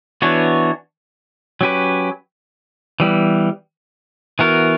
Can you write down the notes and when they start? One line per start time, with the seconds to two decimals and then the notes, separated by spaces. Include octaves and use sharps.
0.22 E3 B3 D4 F#4 C#5
1.61 F#3 C#4 G4 B4
3.00 E3 G3 B3
4.39 E3 B3 F#4 A#4